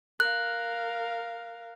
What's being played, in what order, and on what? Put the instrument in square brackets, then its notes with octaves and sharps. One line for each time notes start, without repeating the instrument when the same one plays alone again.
[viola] A#4 F5 [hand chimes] F#6